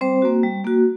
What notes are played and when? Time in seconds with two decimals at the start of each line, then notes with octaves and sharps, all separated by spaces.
0.01 G3 C4 C5
0.22 A#3 F#4
0.43 G3
0.65 A#3 F#4